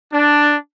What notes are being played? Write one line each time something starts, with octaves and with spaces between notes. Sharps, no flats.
D4